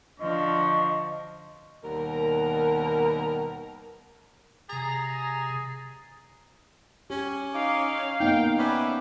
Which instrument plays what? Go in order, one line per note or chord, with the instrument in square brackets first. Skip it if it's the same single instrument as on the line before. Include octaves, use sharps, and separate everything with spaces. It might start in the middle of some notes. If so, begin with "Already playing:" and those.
[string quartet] D3 F3 D4 [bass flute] D#5 [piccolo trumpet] C#6
[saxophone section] D#2 B2 G3 A#4
[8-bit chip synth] C3 A6 [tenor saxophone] G#4 [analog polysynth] A#5
[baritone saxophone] C#4 [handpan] G4
[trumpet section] D#4 D6 [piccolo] F5
[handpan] A#3 B3 D#4 [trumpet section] G5
[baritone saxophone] C#4 [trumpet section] B4 D5 E5 [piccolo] D6